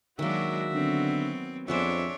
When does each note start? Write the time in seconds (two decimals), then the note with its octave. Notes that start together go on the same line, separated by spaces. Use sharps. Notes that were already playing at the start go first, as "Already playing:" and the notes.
0.19 D#3 F#3 G#3 A#3 D4 F#4 E5
0.73 D3 F#3 B3 C4
1.68 F2 B3 D4 G#4 C5 C#5 E5